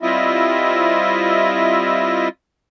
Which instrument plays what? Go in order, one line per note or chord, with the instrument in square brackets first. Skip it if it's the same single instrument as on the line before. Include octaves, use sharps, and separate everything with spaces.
[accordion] G3 C4 E4 F4 D#5 E5